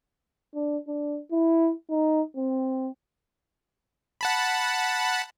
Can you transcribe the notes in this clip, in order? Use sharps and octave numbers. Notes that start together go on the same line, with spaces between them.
D4
D4
E4
D#4
C4
F#5 A5 B5